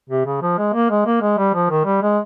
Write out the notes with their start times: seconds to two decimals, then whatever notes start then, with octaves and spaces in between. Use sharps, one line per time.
0.09 C3
0.26 C#3
0.42 F3
0.58 G#3
0.73 A#3
0.90 G#3
1.06 A#3
1.22 G#3
1.38 G3
1.54 F3
1.70 D#3
1.85 G3
2.02 G#3